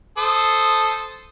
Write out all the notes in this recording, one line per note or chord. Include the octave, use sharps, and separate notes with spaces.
A4 C5 D#6